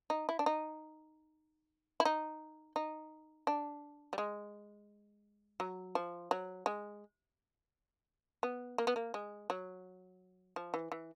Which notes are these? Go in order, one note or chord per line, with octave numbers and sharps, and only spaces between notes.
D#4
E4
D4
D#4
E4
D#4
D#4
D4
G3
G#3
F#3
F3
F#3
G#3
B3
A#3
B3
A#3
G#3
F#3
F3
E3
E3